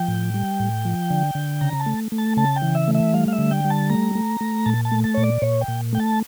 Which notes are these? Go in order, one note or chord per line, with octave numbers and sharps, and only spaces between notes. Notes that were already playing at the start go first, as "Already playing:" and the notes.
Already playing: F3 G5
A2
G3
A2
F3
D3
D3
C#3 A#5
A5
A3
A3
A5
C#3 A5
G5
E3
E5
A3
E5
G3 F5
F5
E5
D3
G5
G3
A5
A3 A#5
A3
A3
A#2 A5
A5
A3
A5
A#2 C#5
D5
A#2 C#5
G5
A#2
A3 G5
A5